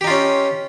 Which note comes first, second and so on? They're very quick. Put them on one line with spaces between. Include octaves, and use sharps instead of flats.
G4 D#4 F4 C#4